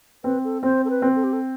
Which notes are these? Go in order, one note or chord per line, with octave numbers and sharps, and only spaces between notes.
C4 B4
A4
C4 C5
A4
B4
C4
A4
G4
A4